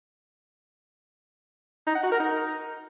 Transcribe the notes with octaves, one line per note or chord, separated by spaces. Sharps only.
D#4
F#5
F#4
A#4
D#4